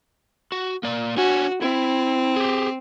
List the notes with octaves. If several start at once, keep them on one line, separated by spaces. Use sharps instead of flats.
F#4
A#3 D5
D4 F#4 C#5 G#5
C4 E4
G4 G#4